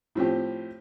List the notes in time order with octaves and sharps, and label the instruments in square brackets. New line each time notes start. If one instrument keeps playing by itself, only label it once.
[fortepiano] A2 F3 C4 G4